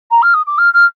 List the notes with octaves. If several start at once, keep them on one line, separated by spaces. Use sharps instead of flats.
A#5
F6
D#6
D6
F6
F6